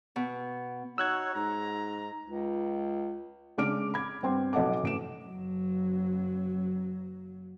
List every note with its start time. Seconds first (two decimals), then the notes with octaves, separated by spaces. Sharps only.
0.16 B2
0.98 D#4 F#4 C#5 E6 F#6 G#6
1.34 G#2 A#5
2.24 C#2
3.58 C#3 G#3 D4 D6 F6 D7
3.94 B5 G#6
4.23 G2 B3 C4 G5 C6
4.53 B1 A4 D#5 F#5 A5 D6
4.83 A1 D7 E7
5.25 F#1 F#3